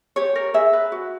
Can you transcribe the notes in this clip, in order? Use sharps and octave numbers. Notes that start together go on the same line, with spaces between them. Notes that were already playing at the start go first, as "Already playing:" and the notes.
G4 C#5
A#4
G#4 E5
B4
F#4